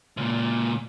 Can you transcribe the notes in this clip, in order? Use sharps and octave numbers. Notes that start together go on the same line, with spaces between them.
C#2 A#2